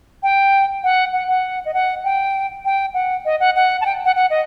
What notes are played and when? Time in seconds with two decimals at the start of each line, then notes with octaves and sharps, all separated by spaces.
0.23 G5
0.84 F#5
1.13 F#5
1.28 F#5
1.65 D#5
1.74 F#5
2.04 G5
2.65 G5
2.94 F#5
3.25 D#5
3.40 F#5
3.56 F#5
3.81 A5
3.86 G5
4.05 F#5
4.16 F#5
4.30 D#5